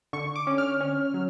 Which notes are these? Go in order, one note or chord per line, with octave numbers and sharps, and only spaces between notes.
D3 C#6
D6
C#4
F6
C#4
F#3